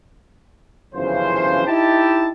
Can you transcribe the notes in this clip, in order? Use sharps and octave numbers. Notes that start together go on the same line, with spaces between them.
G1 F#2 C#3 E3 F3 C5
D#4 E4 G4 A5